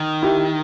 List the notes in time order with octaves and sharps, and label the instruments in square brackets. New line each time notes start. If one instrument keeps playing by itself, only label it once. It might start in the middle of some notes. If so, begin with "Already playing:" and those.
Already playing: [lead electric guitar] D#3
[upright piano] E4 G4